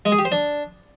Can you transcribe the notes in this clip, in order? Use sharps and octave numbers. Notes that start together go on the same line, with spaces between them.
G#3
G#4
G4
C5
D4